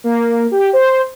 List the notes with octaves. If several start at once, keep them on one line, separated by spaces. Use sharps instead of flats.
A#3
G4
C5